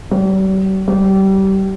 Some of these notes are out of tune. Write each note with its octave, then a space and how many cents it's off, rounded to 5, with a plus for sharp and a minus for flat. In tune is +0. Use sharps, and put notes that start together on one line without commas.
G3 -45
G3 -25